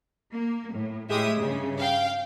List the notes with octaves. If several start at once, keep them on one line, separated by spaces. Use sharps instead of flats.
A#3
A2
A2 G#3 G4 E5 D#6
G2 C#3
F5 G5